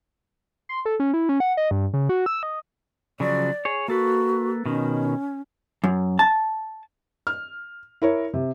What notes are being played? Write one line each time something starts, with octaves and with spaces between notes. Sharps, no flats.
C6
A4
C#4
E4
C#4
F#5
D#5
G2
C#3
F#4
E6
D#5
C#3 F3 F#3 D5
G#4 C#5
A#3 F#4 A4 B4
B2 D#3 C#4
F#2
A5
F6
E4 A#4 C#5
C3